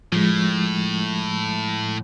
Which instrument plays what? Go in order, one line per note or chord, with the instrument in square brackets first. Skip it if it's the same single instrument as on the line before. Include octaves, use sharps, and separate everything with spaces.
[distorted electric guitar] A2 [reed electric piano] F3 G#3